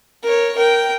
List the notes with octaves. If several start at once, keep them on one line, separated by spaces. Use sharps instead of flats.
A#4 C#5
A#4 G5